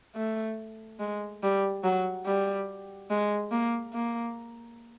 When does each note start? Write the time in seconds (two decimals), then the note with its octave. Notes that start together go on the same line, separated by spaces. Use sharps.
0.16 A3
1.00 G#3
1.43 G3
1.84 F#3
2.26 G3
3.10 G#3
3.51 A#3
3.93 A#3